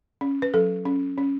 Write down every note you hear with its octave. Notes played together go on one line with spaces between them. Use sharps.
C#4
B4
F#3 A4
C#4
C#4